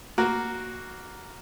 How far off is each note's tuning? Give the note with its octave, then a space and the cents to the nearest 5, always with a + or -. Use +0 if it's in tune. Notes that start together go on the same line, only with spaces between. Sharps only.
A#3 +0 F#4 +0